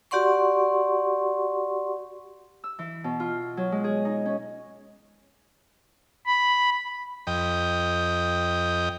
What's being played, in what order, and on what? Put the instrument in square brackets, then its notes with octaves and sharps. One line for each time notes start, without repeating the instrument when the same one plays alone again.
[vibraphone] F#4 G4 D5 F#5 C6 C#6
[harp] E6
E3
B2
F4
F#3
G#3
G#4
D#4
C#4
[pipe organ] B5
[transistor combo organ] F2 D#5 G5